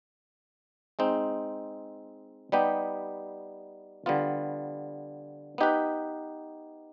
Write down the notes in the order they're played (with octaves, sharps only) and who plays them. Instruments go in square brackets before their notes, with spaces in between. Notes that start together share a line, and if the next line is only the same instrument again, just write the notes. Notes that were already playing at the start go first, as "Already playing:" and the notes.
[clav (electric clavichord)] G#3 C4 D#4
G3 B3 D#4 G4
D3 G3 B3 F4
B3 D#4 G4 B4